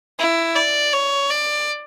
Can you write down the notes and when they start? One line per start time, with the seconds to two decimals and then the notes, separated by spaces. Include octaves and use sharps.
0.19 E4
0.55 D5
0.93 C#5
1.30 D5